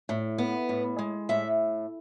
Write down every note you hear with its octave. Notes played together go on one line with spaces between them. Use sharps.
A2
B3
A2
G#3
A2 E5